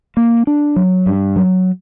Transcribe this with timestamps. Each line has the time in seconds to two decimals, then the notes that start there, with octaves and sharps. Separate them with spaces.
0.17 A#3
0.47 D4
0.76 F#3
1.06 G2
1.36 F#3